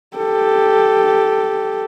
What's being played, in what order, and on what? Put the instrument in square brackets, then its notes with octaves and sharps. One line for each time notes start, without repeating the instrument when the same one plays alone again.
[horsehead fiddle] G4 A4